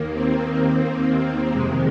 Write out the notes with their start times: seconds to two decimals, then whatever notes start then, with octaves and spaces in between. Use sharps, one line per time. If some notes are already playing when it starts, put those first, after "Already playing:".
Already playing: D#2 D#3 A#3
0.13 C4
1.52 F2 C3 D#3 G#3